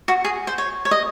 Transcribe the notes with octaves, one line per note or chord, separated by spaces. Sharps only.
F#4
G#4
C5
C#5
C#5
D#5